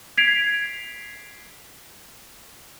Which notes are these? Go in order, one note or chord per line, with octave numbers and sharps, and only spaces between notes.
G#6 B6 C7 D7 F7